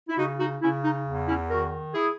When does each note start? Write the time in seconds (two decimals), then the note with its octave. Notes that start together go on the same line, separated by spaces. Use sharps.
0.09 E4
0.17 C#3 D#4 F#4
0.39 D#4 F#4
0.62 C#3 C#4 E4
0.84 D#4
1.06 E2
1.27 C#4 E4
1.50 D#3 F#4 A#4
1.94 E4 G#4